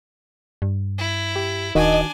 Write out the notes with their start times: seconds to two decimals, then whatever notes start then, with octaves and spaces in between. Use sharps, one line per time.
0.62 G2
0.98 E4
1.36 G4
1.75 D#1 D#3 D4 F#4 D#5 G#5